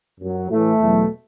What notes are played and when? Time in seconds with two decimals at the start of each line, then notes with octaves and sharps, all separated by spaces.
0.20 F#2 F#3
0.49 A2 E3 A3
0.80 E2 B2 F#3